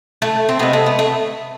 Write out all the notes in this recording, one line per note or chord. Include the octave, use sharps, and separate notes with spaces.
A3
C4
C3 G#3 B3
A3
B3
A3